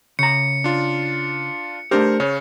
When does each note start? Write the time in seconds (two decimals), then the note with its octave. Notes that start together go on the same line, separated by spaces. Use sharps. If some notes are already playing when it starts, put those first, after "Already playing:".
0.19 C#3 A#5 C#7
0.64 D4 F4
1.91 A3 D4 G4 A#4 C5 F6
2.20 C#3 C#4 C#5